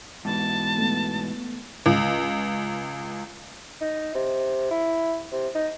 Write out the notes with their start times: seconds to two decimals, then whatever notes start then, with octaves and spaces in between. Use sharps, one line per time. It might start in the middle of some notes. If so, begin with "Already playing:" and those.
0.25 G#2 B2 E3 A5
0.78 A3 B3
1.86 C#2
3.81 D#4
4.15 C3
4.71 E4
5.32 C3
5.55 D#4